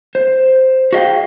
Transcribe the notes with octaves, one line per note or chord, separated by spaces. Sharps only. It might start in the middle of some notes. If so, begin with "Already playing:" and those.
C5
F#4 G#4 D#5 F5 G5